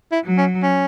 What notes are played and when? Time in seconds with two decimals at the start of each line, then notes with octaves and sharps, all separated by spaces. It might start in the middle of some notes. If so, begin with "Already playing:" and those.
0.12 E4
0.25 F#3
0.37 C#4
0.63 C#4